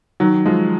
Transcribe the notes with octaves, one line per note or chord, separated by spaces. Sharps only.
D#3 F#3
F3 G#3